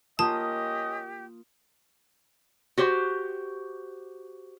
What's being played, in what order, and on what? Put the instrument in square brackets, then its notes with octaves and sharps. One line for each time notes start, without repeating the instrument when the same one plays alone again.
[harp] A#3 F4 D#6 [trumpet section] C#4 D#5 [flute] G4 [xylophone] A5
[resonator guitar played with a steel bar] F#4 G4 C5